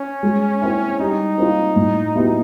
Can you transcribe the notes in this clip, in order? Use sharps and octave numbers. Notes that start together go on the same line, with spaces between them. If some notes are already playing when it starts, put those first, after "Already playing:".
Already playing: C#4
G#3
C4 E4
G3 D#4
C4 F4
A2
F#3 B3 E4 G4